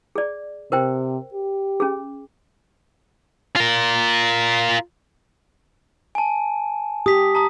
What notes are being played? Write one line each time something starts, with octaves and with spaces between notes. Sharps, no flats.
G#4 D5
C3 A#4 C5 G5
G4
C#4 G#4
F4 A#4
G#5 A5
G4 D#6 B6
A5 A#5 D#6